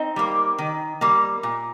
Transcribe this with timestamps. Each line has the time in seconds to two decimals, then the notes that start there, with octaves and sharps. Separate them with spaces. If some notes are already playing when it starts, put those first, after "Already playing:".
Already playing: C4 D#4
0.16 G3 A#3
0.58 D#3
1.01 G3 A#3
1.43 A#2